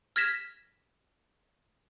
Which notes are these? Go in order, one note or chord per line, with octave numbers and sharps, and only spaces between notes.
F6 G#6 A#6 B6 E7